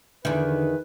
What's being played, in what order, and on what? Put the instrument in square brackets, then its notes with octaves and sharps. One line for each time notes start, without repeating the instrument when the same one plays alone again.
[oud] E2 D#3 [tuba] D3 [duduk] B4